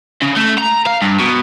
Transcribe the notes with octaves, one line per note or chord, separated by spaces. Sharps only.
C#3
A3
A#5
F5
G2
B2